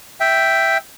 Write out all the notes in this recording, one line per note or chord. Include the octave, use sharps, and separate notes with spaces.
E5 G5